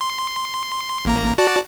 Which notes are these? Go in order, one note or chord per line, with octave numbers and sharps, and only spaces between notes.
C6
A1 A#3 A#5
F#4 D5 A5